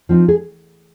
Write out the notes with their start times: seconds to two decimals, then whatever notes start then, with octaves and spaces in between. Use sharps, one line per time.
0.09 F3 C4 D#4
0.28 G#4